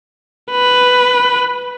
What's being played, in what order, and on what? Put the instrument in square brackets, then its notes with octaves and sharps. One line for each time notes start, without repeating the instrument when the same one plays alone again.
[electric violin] B4